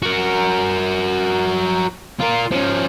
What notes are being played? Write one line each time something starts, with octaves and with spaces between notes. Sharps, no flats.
F#4 A#4
F4 A#4
F3 C#4